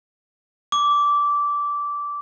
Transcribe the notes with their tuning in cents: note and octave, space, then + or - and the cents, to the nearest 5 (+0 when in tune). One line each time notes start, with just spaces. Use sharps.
D6 -15